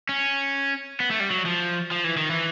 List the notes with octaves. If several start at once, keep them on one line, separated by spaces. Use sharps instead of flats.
C#4
B3
A3
G3
F#3
F3
F3
E3
D#3
E3